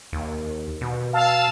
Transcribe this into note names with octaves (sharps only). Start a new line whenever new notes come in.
D#2
B2
F5 A5 E6